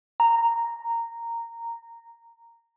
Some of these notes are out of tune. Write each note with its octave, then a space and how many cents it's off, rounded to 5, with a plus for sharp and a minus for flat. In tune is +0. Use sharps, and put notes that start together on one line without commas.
A#5 -10